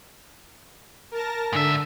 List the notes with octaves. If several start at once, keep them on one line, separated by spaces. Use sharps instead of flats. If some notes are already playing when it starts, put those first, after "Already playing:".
A#4 A5 A#6
G#2 D3 E5